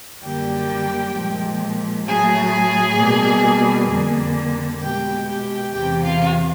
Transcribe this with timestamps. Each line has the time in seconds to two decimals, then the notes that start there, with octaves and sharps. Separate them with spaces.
0.24 F#2 D3 G3 A#3 G4 G5
1.15 A#2 F3 G#3
2.07 A2 F#3 A3 G#4 G#5
2.98 B2 G3 A#3
3.90 F2 D3 G3 A#3
4.81 B2 G#3 G4 G5
5.27 G4 G5
5.72 E2 C3 E3 G4 G5
6.03 F4 F5